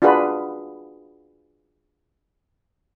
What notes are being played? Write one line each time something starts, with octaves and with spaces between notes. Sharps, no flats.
D4 F4 F#4 G#4 B4 B5